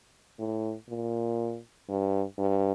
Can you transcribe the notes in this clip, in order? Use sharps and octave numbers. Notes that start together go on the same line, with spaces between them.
A2
A#2
G2
G2